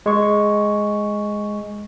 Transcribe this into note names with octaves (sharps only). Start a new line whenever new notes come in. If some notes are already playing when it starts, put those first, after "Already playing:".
G#3 C#6